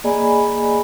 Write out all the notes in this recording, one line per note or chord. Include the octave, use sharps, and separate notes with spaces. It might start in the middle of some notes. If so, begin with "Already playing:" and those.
A#3 G#4 D5 D#5 G#5 B5